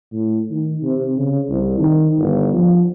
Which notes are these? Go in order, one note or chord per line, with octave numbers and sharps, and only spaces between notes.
A2
D#3
C3
C#3
C2
D#3
G1
F3